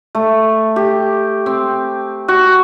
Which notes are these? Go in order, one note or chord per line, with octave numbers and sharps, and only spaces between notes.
A3
G4
C4
F#4